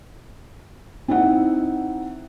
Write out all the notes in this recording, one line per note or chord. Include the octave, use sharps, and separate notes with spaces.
C4 D#4 E4 F#5